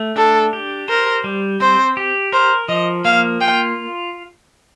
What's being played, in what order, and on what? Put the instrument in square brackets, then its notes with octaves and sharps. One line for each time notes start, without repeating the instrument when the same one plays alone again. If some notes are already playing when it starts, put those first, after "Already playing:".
Already playing: [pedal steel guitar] A3
[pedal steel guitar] D4 [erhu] A4
[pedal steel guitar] G4
[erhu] A#4 [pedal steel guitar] C5
[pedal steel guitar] G3
[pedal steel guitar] C4 [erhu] C5
[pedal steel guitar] G4
[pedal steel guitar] A#4 [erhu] C5
[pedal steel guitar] F3 [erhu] D#5
[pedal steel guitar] A#3 [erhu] F5
[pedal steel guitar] F4 [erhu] G5